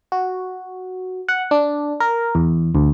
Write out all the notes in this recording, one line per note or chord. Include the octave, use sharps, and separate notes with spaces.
F#4
F#5
D4
A#4
E2
D2